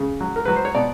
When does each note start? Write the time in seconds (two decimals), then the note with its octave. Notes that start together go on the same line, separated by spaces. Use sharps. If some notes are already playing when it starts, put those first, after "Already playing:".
Already playing: C#3
0.21 F#3
0.36 A#4
0.45 F#3 B4
0.56 C5
0.65 C#5
0.75 B2 D5